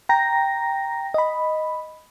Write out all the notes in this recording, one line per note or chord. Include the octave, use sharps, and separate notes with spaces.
G5 A#5 A#6
D#5 B5